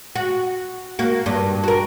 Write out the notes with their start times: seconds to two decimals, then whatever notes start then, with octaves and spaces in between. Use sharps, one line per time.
0.15 F#4
0.99 A#3 F#4
1.26 G2
1.63 F#4 A#4